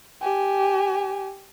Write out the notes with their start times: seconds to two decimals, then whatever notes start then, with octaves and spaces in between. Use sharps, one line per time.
0.21 G4 G#5